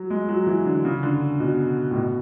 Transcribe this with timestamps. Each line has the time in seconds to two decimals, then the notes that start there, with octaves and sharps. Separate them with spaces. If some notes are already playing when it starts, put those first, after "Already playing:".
Already playing: F#3
0.10 G#3
0.29 F#3
0.47 E3
0.66 D3
0.85 C#3
1.03 D3
1.40 B2
1.91 A2
1.95 B2